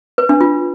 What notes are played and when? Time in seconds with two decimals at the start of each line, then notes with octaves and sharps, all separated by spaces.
0.18 B4
0.29 D4
0.41 F4